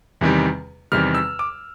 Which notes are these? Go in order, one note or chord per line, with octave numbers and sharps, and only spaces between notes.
E2 C3 D#3 G3
E2 C3 D#3 G3 F6
E6
D6